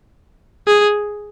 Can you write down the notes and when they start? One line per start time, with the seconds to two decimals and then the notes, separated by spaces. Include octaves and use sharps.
0.68 G#4